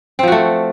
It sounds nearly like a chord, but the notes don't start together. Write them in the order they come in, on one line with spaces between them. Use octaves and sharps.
C4 F3 F#4 A3